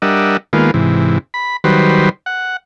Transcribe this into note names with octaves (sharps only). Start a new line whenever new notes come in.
G3 D4 A#4 D#5 E5 F#5
D#3 G#3 A#3 B3 F4
G#2 C3 E3
B5
D#3 F#3 G3 B4 C5
F#5